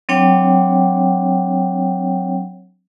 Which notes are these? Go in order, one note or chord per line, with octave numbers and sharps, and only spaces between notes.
F#3 C4 D4 C#5 F#5 G5